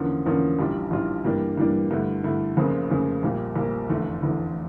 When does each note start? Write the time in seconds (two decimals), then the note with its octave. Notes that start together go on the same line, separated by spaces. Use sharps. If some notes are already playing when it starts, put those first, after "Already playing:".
Already playing: E2 D3 F3 A#3 C#4
0.26 E2 D3 F3 A#3 C#4
0.59 A#1 A2 G3 D4 F4
0.91 A#1 A2 G3 D4 F4
1.25 G2 E3 G3 A#3 D4
1.57 G2 E3 G3 A#3 D4
1.91 G2 D3 A3 E4
2.24 G2 D3 A3 E4
2.57 F1 F2 C#3 F3 A#3
2.90 F1 F2 C#3 F3 A#3
3.23 A#1 A#2 G3 A#3
3.56 A#1 A#2 G3 A#3
3.89 F1 E2 D3 A3
4.22 F1 E2 D3 A3